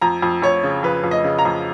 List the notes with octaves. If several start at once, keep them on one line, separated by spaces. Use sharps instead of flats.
F2 A#5
F2
F2 C#5
C#3
F2 B4
F2
D#5
C#3
A#5
F2